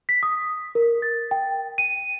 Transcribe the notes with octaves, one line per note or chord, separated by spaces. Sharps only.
B6
D#6
A#4
A6
G5
D#7